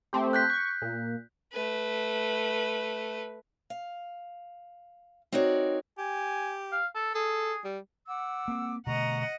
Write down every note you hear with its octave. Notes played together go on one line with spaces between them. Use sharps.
A3 C4 G4
F#6 G6 B6
C#6
A#2
A3 B4
F5
C4 D#4 F#4 A#4 C#5 D5
G4 G#5
F5
A4
G#4 A4
G3
F#5 D6 E6
A#3 C4
B2 D3 A3 D#5 F#5 A#5 C#6